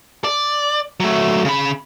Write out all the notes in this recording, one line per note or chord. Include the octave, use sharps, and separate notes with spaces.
D5
F#3 A3
C#3 B5